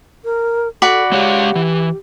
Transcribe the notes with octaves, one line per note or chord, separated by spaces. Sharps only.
A#4
F#4 A4 D5 B5
G#3 G4 C#5 F5
E3